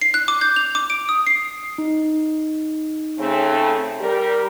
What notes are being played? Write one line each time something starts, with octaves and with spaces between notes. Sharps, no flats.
C7
F#6
D6
G6
F7
D6
D7
D#6
C7
D#4
C#3 A3 C4
G3 G4 A#4